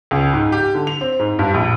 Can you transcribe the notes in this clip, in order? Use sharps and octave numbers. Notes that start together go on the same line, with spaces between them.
C#2
G#2
G4
D3
F7
C4
G#2
G2
A#1